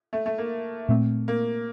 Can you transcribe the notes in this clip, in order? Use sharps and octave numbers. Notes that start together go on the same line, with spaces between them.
A3
A3
A#3
A#2 A3 C4
A#3